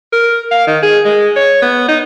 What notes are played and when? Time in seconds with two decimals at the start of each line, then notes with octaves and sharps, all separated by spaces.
0.13 A#4
0.51 F5
0.67 D#3
0.83 G#4
1.05 G#3
1.36 C#5
1.62 B3
1.88 D#4